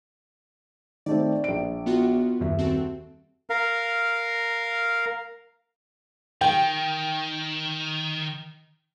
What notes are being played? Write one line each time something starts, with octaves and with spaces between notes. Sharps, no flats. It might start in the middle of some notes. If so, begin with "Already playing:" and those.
D#3 A3 C4 D5
A#1 D7
B3 F4 F#4
D#1 F#2 E5
C4 F#4 A4
A#4 F5
D#3 G5